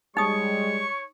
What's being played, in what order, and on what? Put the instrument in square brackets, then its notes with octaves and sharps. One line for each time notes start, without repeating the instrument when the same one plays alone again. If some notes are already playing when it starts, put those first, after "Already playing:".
[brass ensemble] G3 G#3 [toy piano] D#4 D#6 [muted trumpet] C#5 [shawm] C#6